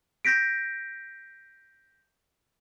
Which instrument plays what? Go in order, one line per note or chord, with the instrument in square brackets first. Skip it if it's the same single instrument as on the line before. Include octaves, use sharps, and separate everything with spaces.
[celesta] G6 A#6 B6 D7